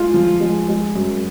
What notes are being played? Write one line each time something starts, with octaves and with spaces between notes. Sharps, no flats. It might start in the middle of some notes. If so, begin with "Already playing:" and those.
Already playing: G#3 F4
F3
G#3
G#3
F#2